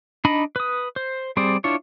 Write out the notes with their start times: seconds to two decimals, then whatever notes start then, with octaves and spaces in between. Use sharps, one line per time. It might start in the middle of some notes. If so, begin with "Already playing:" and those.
0.25 D4 D#4 D#5 B5
0.56 B4 D#6
0.96 C5
1.37 G3 C4 G#4 C5 D5
1.64 D4 E4 F4 C#5